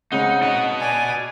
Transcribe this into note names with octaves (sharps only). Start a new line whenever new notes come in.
C#3 G#3 C4 D#4 F#5
F#4 D#5
D5 G#5